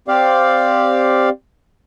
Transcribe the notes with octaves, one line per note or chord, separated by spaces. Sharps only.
C4 G4 D5 F5